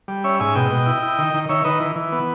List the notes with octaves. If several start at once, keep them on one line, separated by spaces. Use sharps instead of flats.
G3
C#4 C#5 E5
G#2 E5 G#5
B2 D#5 G5
B2
E4
E4
D#3
D#3
D#3 C#5 E5
D#3 B4 D#5
E3
E3
B3